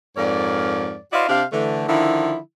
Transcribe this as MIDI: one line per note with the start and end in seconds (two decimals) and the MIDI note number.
0.17 0.96 41
0.17 0.96 44
0.17 0.96 70
0.17 0.96 73
0.17 0.96 74
1.13 1.25 64
1.13 1.25 66
1.13 1.25 72
1.13 1.25 74
1.13 1.25 75
1.13 1.25 77
1.29 1.43 48
1.29 1.43 62
1.29 1.43 67
1.29 1.43 72
1.29 1.43 77
1.52 1.86 50
1.52 1.86 52
1.52 1.86 57
1.88 2.37 50
1.88 2.37 51
1.88 2.37 53
1.88 2.37 64